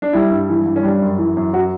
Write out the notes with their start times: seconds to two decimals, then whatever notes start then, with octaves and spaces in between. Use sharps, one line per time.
0.02 D4
0.13 G3 E4
0.31 G2
0.49 E3
0.66 G2
0.76 C#4
0.83 G3 D4
1.02 F#2
1.18 E3
1.37 F#2
1.53 F#3 F#4